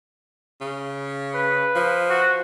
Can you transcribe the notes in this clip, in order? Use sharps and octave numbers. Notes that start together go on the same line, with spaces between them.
C#3
B4
F3
F#4